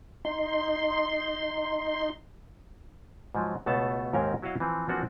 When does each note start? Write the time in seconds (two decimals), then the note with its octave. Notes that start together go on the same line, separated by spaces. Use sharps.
0.25 D#4 C6
3.35 G#2 F3 F#3
3.66 C#2 B2 A3 B3 A4 A5
4.13 D#2 G#2 C4 C#4 A#4
4.42 F#3 E4 F#4 D#5 F5
4.60 E3 F3 C4
4.88 E3 F3 A#3 C4 D4 F#4